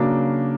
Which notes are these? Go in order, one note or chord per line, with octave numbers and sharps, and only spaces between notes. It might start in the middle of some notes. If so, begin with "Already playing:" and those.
Already playing: C#3 F#3 A#3 D4